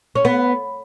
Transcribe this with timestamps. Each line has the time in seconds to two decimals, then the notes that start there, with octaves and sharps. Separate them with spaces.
0.15 C#4
0.25 B3